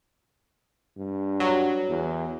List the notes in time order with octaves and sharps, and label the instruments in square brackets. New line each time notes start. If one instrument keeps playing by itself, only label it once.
[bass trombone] G2
[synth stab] F#3
[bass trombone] E2